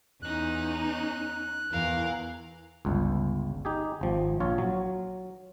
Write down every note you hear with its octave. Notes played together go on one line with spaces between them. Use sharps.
E2 C#4 D#4 F#6
E2 E3 A#4 F5
G1 C#2
D#4 G4 G#4
G#1 F3
A#1 F4 C#5
F#3